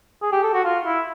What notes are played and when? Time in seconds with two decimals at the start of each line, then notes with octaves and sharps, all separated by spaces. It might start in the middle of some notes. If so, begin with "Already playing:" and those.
0.22 G#4
0.32 G4
0.43 A4
0.54 F#4
0.64 F4
0.86 E4